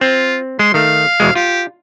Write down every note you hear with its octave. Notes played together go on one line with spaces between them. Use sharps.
C4 F4
G#3 C6
D#3 A3 F5
E2 B2 G#3
F4 G4